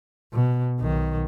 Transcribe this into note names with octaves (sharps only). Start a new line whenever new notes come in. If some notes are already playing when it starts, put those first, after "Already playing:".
B2
B1 D#3